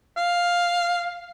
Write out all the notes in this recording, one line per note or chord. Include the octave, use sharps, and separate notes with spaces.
F5